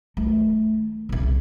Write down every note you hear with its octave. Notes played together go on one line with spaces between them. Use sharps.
D#3 A3
C2 C#3